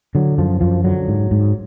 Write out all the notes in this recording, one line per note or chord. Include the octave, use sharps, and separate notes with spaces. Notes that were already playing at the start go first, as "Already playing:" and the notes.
D3 F#3
F#2 F3
F#2 F3
D3 F#3
G#2
G#2